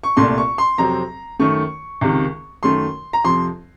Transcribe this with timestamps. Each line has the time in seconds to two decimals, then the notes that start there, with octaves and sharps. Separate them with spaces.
0.04 C#6
0.17 C2 A#2 A3 C6
0.38 C#6
0.58 C6
0.78 F2 C3 F#3 C4 A#5
1.39 F#2 D#3 A3 C#6
2.01 C#2 C3 D#3
2.63 F#2 D#3 A3 C6
3.13 A#5
3.24 F2 C3 F3 C6